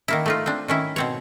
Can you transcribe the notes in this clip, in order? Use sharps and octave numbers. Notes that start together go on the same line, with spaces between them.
D#3 A#3 E4
A3 D#4 F4
C4 D4
D#3 C#4 E4
B2 C4 C#5